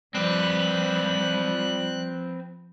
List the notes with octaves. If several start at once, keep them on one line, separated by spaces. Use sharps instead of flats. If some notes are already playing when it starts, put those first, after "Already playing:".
F3 G3 C4 B4 F#6